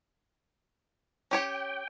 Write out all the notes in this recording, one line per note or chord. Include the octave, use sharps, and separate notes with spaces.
C#4 G4 C#5 G5